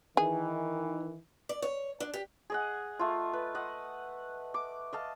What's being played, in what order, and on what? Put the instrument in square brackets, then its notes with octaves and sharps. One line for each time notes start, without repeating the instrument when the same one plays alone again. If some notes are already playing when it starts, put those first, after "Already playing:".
[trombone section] D#3 E3 [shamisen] G#4
[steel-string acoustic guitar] D5
C#5
D4
G4
[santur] G#4 D#5 F#5
A3 F4
B4
D#5 F#5
D6
D#5 F5 A5